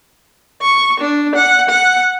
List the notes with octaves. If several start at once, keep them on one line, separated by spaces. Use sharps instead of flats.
C#6
D4
F#5
F#5